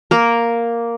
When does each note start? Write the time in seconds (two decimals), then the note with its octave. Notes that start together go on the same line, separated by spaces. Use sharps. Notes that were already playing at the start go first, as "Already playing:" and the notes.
0.11 A#3 A#4